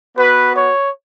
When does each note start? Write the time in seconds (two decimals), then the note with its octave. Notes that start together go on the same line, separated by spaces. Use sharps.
0.17 B3 F#4 B4
0.56 C#5